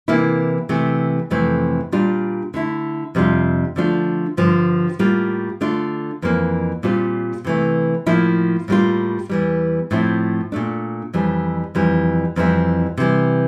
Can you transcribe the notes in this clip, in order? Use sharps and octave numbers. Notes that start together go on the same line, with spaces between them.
C3 E3 A#3 E4
C3 E3 A3
F2 C3 E3 A3 C4
A#2 G3 D4 F4
D3 A3 E4
F2 C3 G3 D4 F4
D3 F3 A3 D4 F4
G2 D3 F3
A2 G3 A#3 F4
D3 A3 D4 F4
F2 E3 A#3
A#2 G3 C4 F4
C3 E3 A3
A2 F3 A#3 E4
A2 G3 A#3 F4
E2 E3 G3
A2 F3 C4 E4
A#2 A3 D4
F2 E3 G3
F2 E3 G3
F2 E3 G3 C4 E4
C3 E3 G3